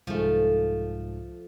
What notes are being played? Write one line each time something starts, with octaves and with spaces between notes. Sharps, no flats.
C2 G#2 F3 A3